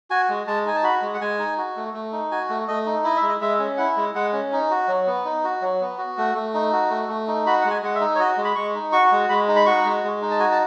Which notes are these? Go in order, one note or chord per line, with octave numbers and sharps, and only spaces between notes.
F#4 G#5
G#3
G#3 A5
D#4 G#5
A5
F#4 B5
G#3
F#5
G#3 G#5
D#4
F#4
A3
A3
D#4
F#4 G#5
A3
A3 D#5
D#4
E4 D#5
E5
G#3
D#5
G#3 E5
C#4
E4 F#5
G#3
G#3 F#5
C#4
D#4
F#4
F#3
B3
D#4
F#4
F#3
B3
F#4
A3
A3
D#4
F#4
A3
A3
D#4
F#4 B5
G#3 F#5
G#5
G#3 F#5
E5
D#4
C#5
F#4 D#5
G#3
B5
G#3 C#6
D#4
F#4 C#6
G#3
G#3 B5
D#4
B5
F#4 C#6
G#3
G#3
D#4
A5
F#4 G#5
A5